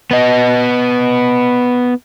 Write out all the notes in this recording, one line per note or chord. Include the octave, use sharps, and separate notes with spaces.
B3 D#5